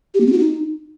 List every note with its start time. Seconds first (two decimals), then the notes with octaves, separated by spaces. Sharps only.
0.14 G4
0.20 A#3
0.27 C4
0.33 F#4
0.39 D#4